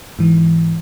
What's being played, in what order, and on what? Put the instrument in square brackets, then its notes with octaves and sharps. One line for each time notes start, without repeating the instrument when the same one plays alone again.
[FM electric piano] G#2 E3